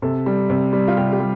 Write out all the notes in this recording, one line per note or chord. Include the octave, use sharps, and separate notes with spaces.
C3 A4
G3
C3
G3
F4
C3 G4
G4
G3